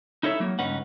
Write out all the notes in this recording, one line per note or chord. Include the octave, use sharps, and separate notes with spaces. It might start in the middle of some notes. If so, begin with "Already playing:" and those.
D#4 E4 A4 C#5 E5
F#3 A#3
C#2 G2 C#4 D#4 B4 F#5